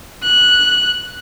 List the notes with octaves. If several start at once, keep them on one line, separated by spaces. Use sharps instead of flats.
F#6